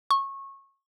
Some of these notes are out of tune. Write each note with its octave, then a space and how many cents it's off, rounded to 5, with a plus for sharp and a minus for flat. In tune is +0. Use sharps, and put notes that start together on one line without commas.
C#6 -20